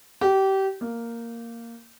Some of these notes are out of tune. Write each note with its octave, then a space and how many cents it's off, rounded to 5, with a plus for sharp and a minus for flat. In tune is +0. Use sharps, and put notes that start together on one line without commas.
G4 -25
A#3 -5